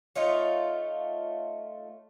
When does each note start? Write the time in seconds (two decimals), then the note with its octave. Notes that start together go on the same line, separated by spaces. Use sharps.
0.15 A3 D#4 F4 C#5